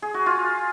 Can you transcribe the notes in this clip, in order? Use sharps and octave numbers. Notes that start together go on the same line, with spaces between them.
G#4
F#4
F4